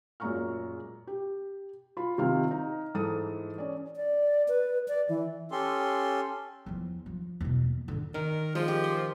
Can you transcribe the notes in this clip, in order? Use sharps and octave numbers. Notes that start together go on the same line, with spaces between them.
F#2 A#2 G#3 A#5 C#6 F6
G4
F4 B5
C3 D#3 F4 F5 F6
D#4
G#2 E3 A4 D#6
C#4 D5
D5
B4
D5
E3
C#4 G4 A4 C6
E2 F3
F3
E2 B2
A#3
G#2 D3
D#3 A#4
F3 G#3
G4
C5